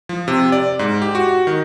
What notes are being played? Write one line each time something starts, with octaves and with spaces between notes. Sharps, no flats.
F3
C3
D5
G#2
G4
F#4
D#3